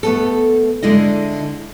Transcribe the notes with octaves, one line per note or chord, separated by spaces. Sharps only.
A3 B3 A4
D3 G#3 E4 D#5